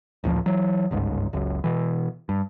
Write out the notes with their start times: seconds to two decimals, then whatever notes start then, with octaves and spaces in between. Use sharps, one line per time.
0.24 A1 D2 A#2 F3
0.46 E3 F#3
0.91 G1 C#2 G#2
1.33 F#1 C#2 F#2
1.64 B2 E3
2.29 G2